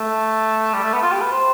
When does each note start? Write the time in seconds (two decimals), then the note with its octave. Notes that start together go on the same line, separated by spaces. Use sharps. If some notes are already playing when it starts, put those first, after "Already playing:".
Already playing: A3
0.74 G3
0.83 A3
0.93 B3
1.02 F4
1.12 G4
1.21 B4
1.31 C5